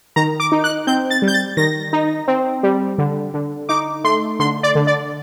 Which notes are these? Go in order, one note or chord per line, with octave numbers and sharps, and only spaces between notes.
D#3 A#5
D6
D#4
F#6
C4 G6
A6
G3
G6
A6
D#3 A#6
D#4
C4
G3
D3
D3
D#4 D6
A3 C6
D3 C6
D5
D3
D5